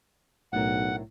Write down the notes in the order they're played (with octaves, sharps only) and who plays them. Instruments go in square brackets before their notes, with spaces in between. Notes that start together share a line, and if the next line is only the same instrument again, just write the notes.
[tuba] B1 [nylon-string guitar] A2 D4 A#4 [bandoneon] F#5